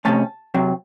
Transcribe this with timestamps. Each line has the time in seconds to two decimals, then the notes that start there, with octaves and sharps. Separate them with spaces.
0.05 C3 E3 A3 C#4 A5
0.54 C3 F#3 C4